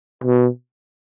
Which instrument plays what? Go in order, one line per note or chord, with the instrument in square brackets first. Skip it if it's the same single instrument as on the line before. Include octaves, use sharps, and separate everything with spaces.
[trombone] B2